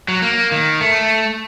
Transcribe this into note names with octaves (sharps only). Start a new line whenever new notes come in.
F#3
A#3
D#3
A3